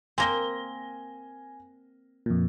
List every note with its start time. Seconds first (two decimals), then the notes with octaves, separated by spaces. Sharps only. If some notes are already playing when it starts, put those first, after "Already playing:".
0.18 A#3 C4 G#5 A#6 G7
2.26 F2 A#2